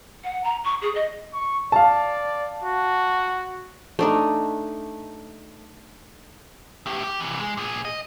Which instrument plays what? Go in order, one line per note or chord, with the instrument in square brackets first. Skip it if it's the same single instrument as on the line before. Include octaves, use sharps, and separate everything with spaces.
[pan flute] F#5
A#5
C#6
G#4
D#5
[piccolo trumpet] C#6
[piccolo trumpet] D5 [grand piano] F5 A5
[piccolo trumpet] F#4
[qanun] A3 D4 D#4
[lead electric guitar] A2 G4
G4
C3 E3
G#3
A#2 G#4
D#5